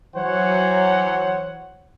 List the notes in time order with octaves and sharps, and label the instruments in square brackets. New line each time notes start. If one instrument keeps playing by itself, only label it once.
[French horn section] E3 F#3 [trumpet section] C5 C#5 F#5